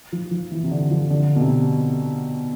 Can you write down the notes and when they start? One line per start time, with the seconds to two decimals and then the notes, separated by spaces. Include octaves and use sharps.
0.12 F3
0.31 F3
0.51 E3
0.63 C3
0.71 D3
0.91 F3
1.10 D3
1.36 B2
1.41 C3